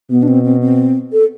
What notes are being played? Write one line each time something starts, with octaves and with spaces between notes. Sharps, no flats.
B2 B3
D4
C4
C4
C4
A4